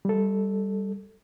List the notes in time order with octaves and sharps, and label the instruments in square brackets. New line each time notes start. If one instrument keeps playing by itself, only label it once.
[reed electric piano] G3 A4